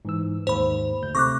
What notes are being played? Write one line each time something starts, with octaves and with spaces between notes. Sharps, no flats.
G#2 E3 E6
D#2 G#2 C5 B5
D2 G6
C3 A3 C#6 D6 F#6 A#6